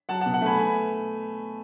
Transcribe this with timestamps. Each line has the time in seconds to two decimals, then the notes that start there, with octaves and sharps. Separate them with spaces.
0.09 F#3 F#5 A5
0.21 F#5 A5
0.26 B2
0.33 F#5 A5
0.41 A3 G#5 B5
0.58 B3 G#5 B5